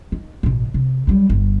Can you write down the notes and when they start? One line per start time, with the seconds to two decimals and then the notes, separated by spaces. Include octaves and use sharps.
0.12 D#3
0.43 A1 B2
0.74 C3
1.07 F#3 G3
1.29 G1